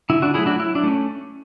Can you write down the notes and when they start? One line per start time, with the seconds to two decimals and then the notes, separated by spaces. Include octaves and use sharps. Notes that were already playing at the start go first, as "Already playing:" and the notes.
0.10 D3 E4
0.22 D4 F#4
0.34 F#3 A3 E4 G#4
0.46 D4 F#4
0.59 F#3 E4
0.75 D4
0.84 A3 C#4